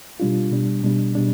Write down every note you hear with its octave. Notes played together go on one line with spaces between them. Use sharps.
B2 G3 D4 F4
B2 G3 D4
B2 G3 D4
B2 G3 D4